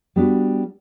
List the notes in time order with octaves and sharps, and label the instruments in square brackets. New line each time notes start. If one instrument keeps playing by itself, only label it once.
[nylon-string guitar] G3 B3 D4 F#4